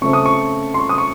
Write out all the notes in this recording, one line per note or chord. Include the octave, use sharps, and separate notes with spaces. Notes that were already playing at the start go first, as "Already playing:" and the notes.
C#3 A3 C4 C#6
D#6
C#6
C6
C#6
D#6
C#6